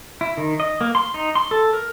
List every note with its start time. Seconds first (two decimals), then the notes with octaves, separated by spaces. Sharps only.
0.21 E4
0.37 D#3
0.60 D#5
0.81 A#3
0.95 C6
1.14 D#4
1.36 C6
1.51 A4
1.73 A#4